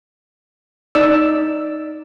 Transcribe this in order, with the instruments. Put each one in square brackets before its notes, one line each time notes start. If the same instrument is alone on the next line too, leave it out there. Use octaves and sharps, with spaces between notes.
[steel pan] D#4 D5 E6